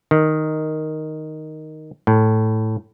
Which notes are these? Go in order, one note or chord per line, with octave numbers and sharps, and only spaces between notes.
D#3
A2